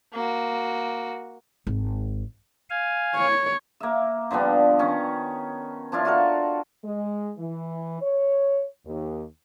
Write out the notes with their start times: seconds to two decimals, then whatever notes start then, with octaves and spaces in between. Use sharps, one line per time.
0.13 A#3 F#4
1.67 G#1
2.70 F5 G#5
3.15 C#5
3.80 A#3 E5
4.31 D3 F3 G3 B3
4.79 D#3 C#4
5.92 F3 D4 E4 F4
6.05 F4 F#4 A4 A#4
6.84 G#3
7.39 E3
8.01 C#5
8.86 D#2